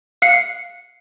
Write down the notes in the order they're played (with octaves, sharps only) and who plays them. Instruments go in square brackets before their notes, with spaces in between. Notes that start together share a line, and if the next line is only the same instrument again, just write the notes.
[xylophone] F5 F#6 C7 C#7